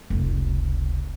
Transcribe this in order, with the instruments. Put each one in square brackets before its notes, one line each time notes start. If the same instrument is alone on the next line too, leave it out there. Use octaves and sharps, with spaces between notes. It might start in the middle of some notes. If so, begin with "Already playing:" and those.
[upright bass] F1 C#2